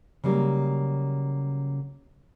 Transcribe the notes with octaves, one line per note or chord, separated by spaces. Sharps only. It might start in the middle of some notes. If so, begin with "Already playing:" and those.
C#3 F#3 G3 A#3